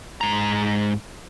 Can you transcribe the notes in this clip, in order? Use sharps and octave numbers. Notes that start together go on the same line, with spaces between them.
G#2 A#5